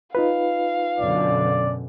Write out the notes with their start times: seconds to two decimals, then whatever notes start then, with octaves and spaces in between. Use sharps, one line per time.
0.15 D#4 F4 B4 F5
0.99 F#2 B2 D3 D5